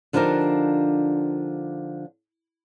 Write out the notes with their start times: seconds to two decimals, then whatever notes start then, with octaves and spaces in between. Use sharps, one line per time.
0.13 D3 F3 D4 D#4 G4 A#4